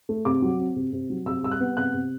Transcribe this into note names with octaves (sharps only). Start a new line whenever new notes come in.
A3
C3 D6
F#3
C4
C3
C3
F#3
C3 E6
G3 E6
F#6
B3
C3 F#6
C3